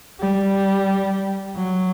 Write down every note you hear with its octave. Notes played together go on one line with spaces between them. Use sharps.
G3
F#3